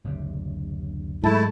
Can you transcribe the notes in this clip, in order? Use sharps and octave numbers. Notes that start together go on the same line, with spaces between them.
F#1 D2 C3
G#2 F#3 G#3 A3 E4 A5